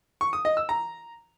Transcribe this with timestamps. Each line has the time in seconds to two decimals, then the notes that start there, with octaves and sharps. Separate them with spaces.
0.21 C#6
0.33 D#6
0.45 D#5
0.57 E6
0.69 A#5